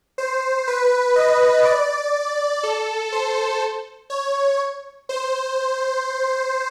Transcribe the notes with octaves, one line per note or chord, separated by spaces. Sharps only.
C5
B4
D#5
D5
A4
C5
C#5
C5